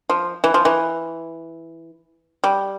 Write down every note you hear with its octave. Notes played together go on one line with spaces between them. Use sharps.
F3
E3
F3
E3
G3